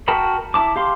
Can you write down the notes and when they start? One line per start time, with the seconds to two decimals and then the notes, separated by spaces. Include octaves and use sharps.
0.08 F#4 A#4 G5 A5 B5
0.54 E4 A5 D6
0.76 G4 F5 C6